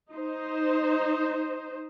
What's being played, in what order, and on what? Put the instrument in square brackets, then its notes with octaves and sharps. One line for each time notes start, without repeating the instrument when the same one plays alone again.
[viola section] D#4 C5